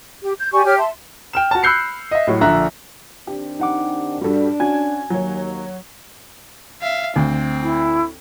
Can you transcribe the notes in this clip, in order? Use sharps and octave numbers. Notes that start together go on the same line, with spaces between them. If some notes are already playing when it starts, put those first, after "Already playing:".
G4
G6
G4 D5 G#5 C#6
G4 C#5 F6
E5 A5 C6
G5 F6 E7
F#4 A5
B5 E6 F#6 G6 C7 C#7
D#5 E5
A2 F#3
A#1 D3 E5 A#5 F#6
D#3 C4 D4 G4
D#4 F#5 D6
G2 G3 D4 F#4 A4
C#4 F#4 G#5 G#6
D#2 F#3 A#3 C#5
E5 F5
D2 C4
E4